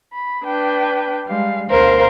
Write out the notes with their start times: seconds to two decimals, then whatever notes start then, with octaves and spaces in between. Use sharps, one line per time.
0.13 B5
0.45 D4 B4 G5
1.26 G3 G#3 F5
1.70 D2 B2 A#4 C5 F5